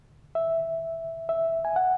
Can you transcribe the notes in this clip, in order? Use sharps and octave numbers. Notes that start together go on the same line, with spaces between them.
E5
E5
G#5
F#5